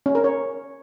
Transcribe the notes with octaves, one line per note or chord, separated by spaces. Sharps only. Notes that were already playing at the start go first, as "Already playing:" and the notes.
C#4
A#4
C#5